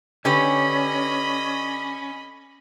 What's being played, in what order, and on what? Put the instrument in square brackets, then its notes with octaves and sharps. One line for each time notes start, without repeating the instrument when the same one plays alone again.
[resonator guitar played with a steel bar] D3 G4 B4 [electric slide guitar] C#4 [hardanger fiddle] D#5 B5